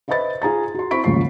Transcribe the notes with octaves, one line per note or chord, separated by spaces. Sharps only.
B4 C5 D#5 E5 B5 A6
F4 G#4 A#5 A6
F#4 C6
C4 E4 B5 C#6 B6 D7
D#2 G#2 C#3 F3 C#6 C7